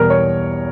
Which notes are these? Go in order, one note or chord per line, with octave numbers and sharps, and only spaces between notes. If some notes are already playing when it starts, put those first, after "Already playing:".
Already playing: E2 B2 G3 A#4
C#5